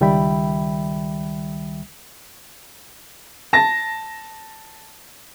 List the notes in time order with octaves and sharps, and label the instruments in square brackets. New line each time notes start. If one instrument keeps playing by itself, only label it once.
[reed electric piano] C#2 D#3 G3 E5 G5 B5
[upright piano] A5 A#6